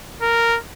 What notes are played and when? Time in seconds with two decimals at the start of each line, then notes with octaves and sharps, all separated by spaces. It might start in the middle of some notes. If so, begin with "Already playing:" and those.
0.22 A#4